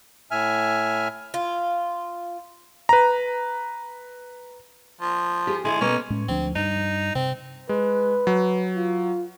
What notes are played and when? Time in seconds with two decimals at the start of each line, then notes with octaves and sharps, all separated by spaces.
0.31 A2 E5 G#5 F6
1.34 F4
2.89 B4 A#5
5.00 F3
5.47 G4 G#4
5.64 D3 G#3 E4 A4
5.81 B2 A#3 C#4
6.10 A2 G#3 C#4
6.28 D2 F3 C4 D4
6.56 G2 D#4
7.15 C3 C4
7.69 G#3 B4
8.27 F#3
8.76 F4